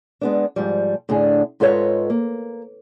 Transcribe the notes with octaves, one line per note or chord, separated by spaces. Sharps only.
G#3 B3 D4
G#2 F3 G3
A2 D3 D4 G#4
G#2 F4 A4 B4 C#5 D#5
A#3